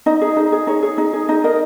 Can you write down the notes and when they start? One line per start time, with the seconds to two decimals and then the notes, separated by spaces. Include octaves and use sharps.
0.06 D#4 D#5
0.21 G#4
0.37 D#4 D#5
0.52 G#4
0.67 D#4 C#5
0.83 G#4
0.98 D#4 D#5
1.14 G#4
1.29 D#4 D#5
1.44 A#4 D#5